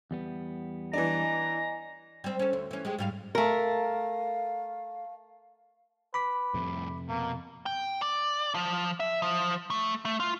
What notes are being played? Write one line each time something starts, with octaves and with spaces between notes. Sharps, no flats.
E2 G3 B3
E3 D4 D#5 G#5 A#5
G3 C4
C#4 A4
D2
E3 C#4
G#3 G4
G#2 G3 F5
A3 A#4 F5
B4 B5 D6 B6
C2 F2 A2 C3
B2 A#3
G5
D5
F3
E5
F3
A3
A3
F4